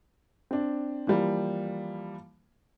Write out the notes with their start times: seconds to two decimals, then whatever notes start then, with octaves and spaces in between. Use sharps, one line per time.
0.51 C4 D4
1.07 E3 F3 G3 A#3